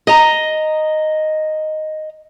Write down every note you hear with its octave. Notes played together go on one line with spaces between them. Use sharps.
D#5 A#5